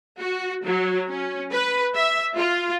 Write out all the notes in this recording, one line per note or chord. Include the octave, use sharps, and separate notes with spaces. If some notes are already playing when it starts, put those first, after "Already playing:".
F#4
F#3
C#4
B4
E5
F4